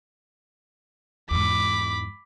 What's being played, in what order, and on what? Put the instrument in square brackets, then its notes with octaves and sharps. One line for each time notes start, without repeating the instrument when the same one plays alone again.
[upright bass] E2 G#2 [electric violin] B5 D6